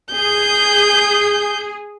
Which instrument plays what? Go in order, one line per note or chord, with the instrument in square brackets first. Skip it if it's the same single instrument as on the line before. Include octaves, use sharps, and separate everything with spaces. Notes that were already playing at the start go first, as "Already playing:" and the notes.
[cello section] G#4 [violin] G6